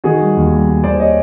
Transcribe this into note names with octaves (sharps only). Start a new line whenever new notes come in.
D#3 F#4 G#4
G3
D#2
G3
G3
D#2 C5 D5
C#5 D#5